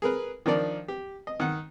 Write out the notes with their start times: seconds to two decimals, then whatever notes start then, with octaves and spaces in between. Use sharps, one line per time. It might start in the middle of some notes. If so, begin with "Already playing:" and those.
0.02 G#4 A#4 B4
0.46 D#3 F3 D4 A#4 D5
0.88 G4
1.27 D#5
1.40 D#3 F#5